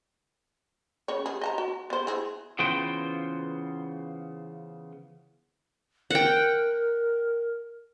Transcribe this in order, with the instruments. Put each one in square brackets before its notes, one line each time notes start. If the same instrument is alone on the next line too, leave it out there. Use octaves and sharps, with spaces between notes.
[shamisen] C#3 C#5
G#4
D#5 A5 A#5
F#4
B3 C5
E3 G#4
[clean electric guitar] C#3 E3 B3 F4 C5 G5
[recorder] A#4 [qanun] F#5 G5